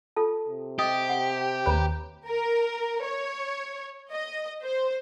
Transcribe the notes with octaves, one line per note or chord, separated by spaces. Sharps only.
F4 A4 A5
C3
G4 D#5 D#6
F#5
D#2 B4 C#5 A#5
A#4
C#5
D#5
C5